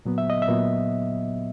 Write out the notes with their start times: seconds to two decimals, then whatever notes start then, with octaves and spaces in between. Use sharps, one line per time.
0.05 A#2 F#3 B3
0.18 E5
0.30 D#5
0.42 E5
0.48 A#2 F#3 B3